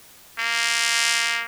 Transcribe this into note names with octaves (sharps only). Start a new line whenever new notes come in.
A#3